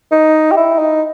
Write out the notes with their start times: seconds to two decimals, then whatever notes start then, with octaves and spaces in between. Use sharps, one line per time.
0.11 D#4
0.52 G4
0.57 E4
0.79 D#4